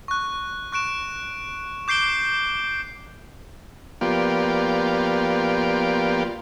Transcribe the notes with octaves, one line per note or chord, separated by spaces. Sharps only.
C#6 F#6
C#6 F#6 D7 E7
D6 G6 C7 D7 G7
F3 A#3 B3 F4 G4 D5